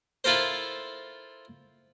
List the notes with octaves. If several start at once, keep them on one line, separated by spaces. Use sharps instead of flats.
E4 F4 A4 A#4 C5